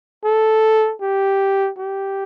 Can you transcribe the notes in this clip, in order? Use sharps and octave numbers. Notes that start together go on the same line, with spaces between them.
A4
G4
G4